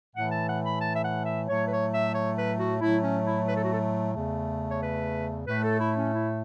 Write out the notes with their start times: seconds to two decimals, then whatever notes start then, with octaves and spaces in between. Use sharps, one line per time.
0.15 A2 E3 A3 F#5
0.32 A5
0.48 F#5
0.65 B5
0.81 A5
0.94 E5
1.04 F#5
1.26 E5
1.48 A2 F#3 A3 C#5
1.66 B4
1.70 C#5
1.92 E5
2.14 C#5
2.37 B4
2.59 F#4
2.81 A2 F#3 A3 E4
3.03 C#4
3.25 E4
3.47 B4
3.55 A4
3.63 F#4
3.72 A4
4.13 E2 C#3 A3
4.71 C#5
4.80 B4
5.46 A2 A3 B4
5.63 A4
5.80 E4
5.96 C#4
6.13 E4